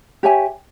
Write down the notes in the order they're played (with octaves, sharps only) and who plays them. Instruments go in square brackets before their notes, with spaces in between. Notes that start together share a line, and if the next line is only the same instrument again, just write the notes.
[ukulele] G4 C#5 E5 G#5